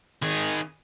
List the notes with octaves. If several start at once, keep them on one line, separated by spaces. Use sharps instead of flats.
D#3 G#4